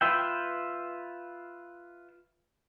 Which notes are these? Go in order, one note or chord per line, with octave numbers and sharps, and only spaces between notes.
F4 B4 E5 G5